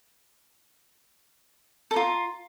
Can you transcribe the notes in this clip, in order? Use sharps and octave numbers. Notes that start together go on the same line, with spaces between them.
F4 A4 A#5